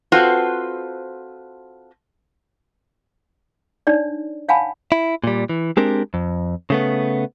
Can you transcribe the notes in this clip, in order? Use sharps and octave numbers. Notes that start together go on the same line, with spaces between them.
C4 F4 F#4 A4 B4 C5
D4 D#4 C#5 D5
C#5 F5 F#5 G#5 A5 B5
E4
A#2 G3
E3
G#3 C4 D4 G4 A#4
F2
C#3 A3 B3